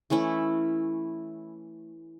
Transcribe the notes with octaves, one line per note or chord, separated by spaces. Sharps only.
E3 A3 C#4 E4